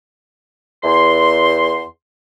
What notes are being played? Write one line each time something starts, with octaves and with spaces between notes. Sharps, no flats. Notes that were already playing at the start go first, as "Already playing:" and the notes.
E2 C6